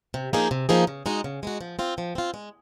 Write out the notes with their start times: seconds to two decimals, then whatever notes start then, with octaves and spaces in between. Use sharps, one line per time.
0.14 C3
0.33 F3 A#3 D#4 G#4
0.51 C3
0.69 F3 A#3 D#4 G#4
0.87 C#3
1.06 G#3 D#4 F#4
1.24 C#3
1.43 G#3 D#4 F#4
1.61 F3
1.79 C4 F4
1.98 F3
2.15 C4 F4
2.34 G#3